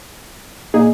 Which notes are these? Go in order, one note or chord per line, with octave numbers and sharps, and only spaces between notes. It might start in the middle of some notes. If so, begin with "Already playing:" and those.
A#2 A#3 D#4 G#4